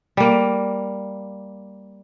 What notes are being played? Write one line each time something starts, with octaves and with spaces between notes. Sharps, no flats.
G3 A#3